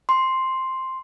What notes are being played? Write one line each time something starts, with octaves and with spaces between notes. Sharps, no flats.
C6